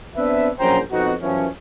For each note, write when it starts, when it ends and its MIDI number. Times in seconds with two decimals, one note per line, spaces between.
0.16 0.49 59
0.16 0.49 60
0.16 0.49 62
0.16 0.49 71
0.16 0.49 76
0.60 0.79 34
0.60 0.79 54
0.60 0.79 61
0.60 0.79 72
0.60 0.79 79
0.60 0.79 82
0.91 1.13 41
0.91 1.13 47
0.91 1.13 60
0.91 1.13 63
0.91 1.13 66
1.22 1.46 42
1.22 1.46 52
1.22 1.46 53
1.22 1.46 59
1.22 1.46 61